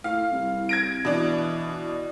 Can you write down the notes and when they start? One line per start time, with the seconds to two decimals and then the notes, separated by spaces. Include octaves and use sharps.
0.04 A2 F5
0.32 C2
0.69 G#6 A#6 D7
1.05 B2 E3 D4